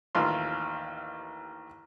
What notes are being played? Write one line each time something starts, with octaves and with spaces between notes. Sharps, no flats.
A1 D#2 F4 C6